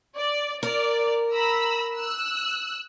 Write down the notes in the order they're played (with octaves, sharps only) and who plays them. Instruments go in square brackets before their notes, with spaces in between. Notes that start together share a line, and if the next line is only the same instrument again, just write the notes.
[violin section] D5
[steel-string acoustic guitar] A#4 [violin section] D5
[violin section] A#5 B5 E6
E6 F#6